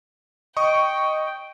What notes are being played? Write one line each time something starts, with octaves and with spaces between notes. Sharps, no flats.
D#5 G5 C#6 D#6